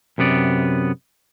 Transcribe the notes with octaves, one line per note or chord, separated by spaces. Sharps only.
F#2 C3 B3 D5